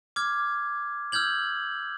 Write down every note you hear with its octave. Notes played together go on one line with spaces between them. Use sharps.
D6 F6 G#6
E6 F6 G6 G#6 F#7